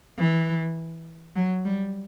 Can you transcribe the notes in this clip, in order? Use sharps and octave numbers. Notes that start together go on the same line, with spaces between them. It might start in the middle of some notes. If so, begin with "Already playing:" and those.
E3
F#3
G3